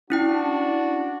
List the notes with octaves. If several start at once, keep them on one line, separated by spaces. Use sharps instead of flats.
C#4 D4 E4 F#4 G5